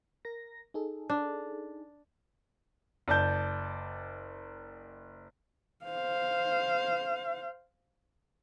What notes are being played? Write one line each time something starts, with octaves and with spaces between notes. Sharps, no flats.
A#4 A#6
D#4 G#4 A4
D4
F#1 D5 A5 G6
C5 F5